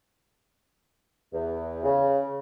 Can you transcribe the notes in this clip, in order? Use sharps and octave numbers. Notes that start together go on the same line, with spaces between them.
E2
C#3